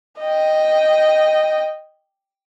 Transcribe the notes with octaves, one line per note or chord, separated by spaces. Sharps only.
D#5 G5